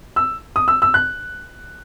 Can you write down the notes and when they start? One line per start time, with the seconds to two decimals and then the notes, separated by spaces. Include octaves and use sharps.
0.16 E6
0.56 D#6
0.68 E6
0.82 E6
0.94 F#6